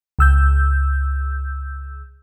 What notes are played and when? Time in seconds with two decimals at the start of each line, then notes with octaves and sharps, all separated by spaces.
0.19 C#2 E6 G6